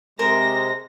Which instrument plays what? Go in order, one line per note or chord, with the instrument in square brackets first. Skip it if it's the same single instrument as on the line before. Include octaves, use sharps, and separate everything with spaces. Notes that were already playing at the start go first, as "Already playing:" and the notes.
[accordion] C3 G#3 [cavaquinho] A#4 C5 [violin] A#6